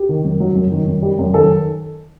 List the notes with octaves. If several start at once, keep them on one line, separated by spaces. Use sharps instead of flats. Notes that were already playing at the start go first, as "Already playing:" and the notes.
Already playing: G4
D#3
F#2
F#3
F#2
D#3
F#2
G3
F#2
D#3 A4